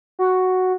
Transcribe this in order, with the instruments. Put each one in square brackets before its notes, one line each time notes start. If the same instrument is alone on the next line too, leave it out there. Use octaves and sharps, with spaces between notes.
[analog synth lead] F#4